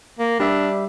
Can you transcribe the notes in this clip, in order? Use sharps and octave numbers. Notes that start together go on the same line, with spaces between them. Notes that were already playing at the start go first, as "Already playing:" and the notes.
A#3
G3 D4 E5